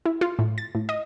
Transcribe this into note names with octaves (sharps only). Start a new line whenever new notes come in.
E4
F4
A2
A6
A2
D#5